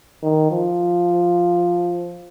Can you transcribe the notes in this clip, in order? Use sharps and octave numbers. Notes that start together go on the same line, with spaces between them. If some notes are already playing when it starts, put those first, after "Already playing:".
D#3
F3